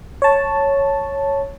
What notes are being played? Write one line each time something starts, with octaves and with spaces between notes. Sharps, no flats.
C#5 A5